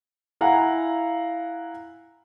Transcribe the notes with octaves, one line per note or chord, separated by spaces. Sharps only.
E4 F5 F#5 G#5 A#5